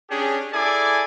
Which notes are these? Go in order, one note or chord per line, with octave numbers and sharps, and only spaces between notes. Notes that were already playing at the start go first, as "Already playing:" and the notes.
C#4 D4 G4 G#4
E4 G#4 A4 D5 G#5 D6